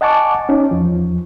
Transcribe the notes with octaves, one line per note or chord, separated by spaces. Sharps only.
D#5 F#5 G#5 A5 C#6 D6
C#4 D#4
E2 F3